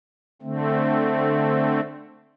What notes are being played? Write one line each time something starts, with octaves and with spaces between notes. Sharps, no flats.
D3 A3 C4